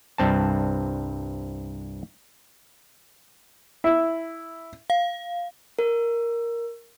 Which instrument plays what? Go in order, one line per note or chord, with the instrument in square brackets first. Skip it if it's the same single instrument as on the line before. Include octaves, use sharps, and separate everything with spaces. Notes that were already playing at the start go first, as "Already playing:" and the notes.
[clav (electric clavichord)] C2 G2 C4 A5
[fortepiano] E4
[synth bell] F5
[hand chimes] A#4